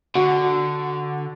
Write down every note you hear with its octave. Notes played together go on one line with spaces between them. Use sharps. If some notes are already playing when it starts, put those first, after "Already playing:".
D3 F#4